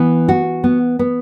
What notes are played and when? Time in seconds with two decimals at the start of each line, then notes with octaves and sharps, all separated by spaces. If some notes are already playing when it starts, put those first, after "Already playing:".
Already playing: E3 B3
0.29 F#4
0.64 B3
0.99 B3